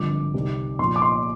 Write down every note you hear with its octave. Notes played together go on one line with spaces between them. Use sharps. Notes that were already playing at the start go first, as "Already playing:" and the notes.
Already playing: G#1 G2 D3 F3 D6
C2 C3 D#3
A#1 A#2 F3 C6
D6
C6